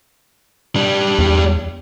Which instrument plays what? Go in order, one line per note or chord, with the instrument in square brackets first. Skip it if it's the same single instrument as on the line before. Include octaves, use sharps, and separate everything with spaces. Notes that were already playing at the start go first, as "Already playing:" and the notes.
[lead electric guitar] G3 D4
[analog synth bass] E2